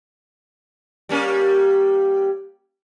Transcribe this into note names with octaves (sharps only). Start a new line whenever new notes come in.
G3 A#3 C#4